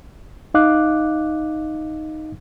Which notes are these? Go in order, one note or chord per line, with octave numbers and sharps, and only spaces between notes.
D#4 D#5 F5 D6 F#6